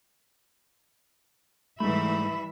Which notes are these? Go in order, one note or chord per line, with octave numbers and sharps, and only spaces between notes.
G#2 E3 G3 A3 E5 B5